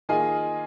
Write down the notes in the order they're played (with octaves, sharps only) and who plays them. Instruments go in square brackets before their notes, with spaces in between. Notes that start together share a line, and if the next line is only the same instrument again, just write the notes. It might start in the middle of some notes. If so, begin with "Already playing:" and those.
[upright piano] D#3 A#3 F4 G#4 D#5 [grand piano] G#5